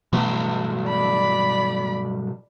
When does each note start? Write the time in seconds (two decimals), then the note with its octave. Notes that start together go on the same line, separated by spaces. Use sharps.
0.13 B1 G2 B2 E3 A3
0.86 D5 B5